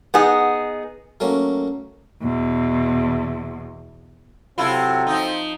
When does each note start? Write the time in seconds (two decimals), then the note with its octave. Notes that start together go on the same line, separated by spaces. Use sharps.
0.14 B3 D#4 G#4
1.20 F#3 A3 A#3 C#4
2.22 E2 B2
4.58 C3 F#3 C4 E4 F4 A4
5.07 F3 D#4